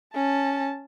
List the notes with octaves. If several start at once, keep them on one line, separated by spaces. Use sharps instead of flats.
C#4 A5